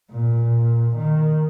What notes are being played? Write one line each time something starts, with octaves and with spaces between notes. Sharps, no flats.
A#2
D#3